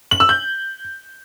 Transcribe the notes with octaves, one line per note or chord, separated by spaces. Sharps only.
F#7
E6
G6